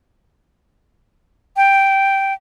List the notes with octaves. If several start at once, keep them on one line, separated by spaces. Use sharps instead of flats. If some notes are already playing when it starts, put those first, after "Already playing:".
G5